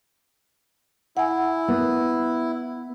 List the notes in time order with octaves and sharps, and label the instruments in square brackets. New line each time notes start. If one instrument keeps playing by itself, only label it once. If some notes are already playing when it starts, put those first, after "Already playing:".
[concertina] E4 [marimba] F#5 G#5
[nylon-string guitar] B3